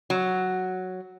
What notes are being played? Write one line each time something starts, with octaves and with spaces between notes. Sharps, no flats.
F#3